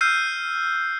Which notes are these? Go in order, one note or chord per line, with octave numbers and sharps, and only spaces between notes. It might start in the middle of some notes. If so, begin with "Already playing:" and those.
E6 F6 G6 C7 D#7